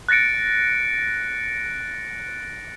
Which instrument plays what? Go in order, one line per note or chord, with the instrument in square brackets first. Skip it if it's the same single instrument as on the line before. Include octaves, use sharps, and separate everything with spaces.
[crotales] F#6 A6 A#6 C#7 D7